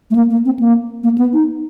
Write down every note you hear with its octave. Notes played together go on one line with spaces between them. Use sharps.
A3
A#3
A#3
C4
A#3
A#3
B3
D#4